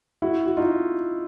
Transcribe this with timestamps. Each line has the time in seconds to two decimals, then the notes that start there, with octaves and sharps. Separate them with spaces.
0.22 E4 F#4
0.46 F#4
0.57 D#4 F4